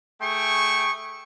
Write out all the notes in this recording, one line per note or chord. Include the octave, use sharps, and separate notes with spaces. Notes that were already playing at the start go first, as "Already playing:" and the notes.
A3 G#4 G5 C#6